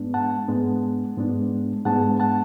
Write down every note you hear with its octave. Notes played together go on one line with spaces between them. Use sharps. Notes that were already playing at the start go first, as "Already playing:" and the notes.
Already playing: G#2 G#3 B3 D4
F#5 A5
G#2 G#3 B3 D4
G#2 G#3 B3 D4
G#2 G#3 B3 D4 F#5 A5
F#5 A5